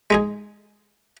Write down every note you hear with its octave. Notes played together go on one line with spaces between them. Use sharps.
G#3 D#4 G#4